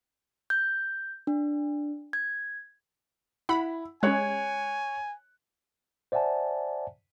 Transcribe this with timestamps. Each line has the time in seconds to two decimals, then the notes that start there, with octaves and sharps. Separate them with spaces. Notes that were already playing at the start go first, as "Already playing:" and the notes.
0.50 G6
1.27 D4
2.13 G#6
3.49 E4 F#5 B5
4.03 G#3 C#4 C#5 G#5 F#6
6.12 C5 D5 E5 F#5 G#5 A5